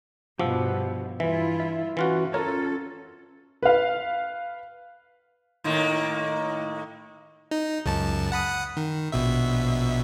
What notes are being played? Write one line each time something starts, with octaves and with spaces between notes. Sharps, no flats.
G2 B2 F3 G4 F#5 E6
G2 E3 E4 F4 E5
E5
E3 C#4 F4 F#4
C#4 F4 A4 A#4 C#5
B4 F5
A2 D#3 A#3
D#4
C#2 F#2 A5
F#5 B5 D#6
D#3
A#1 B2 E5